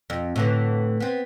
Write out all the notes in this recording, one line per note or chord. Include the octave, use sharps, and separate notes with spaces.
F2
A2 D3 E3
B3 C4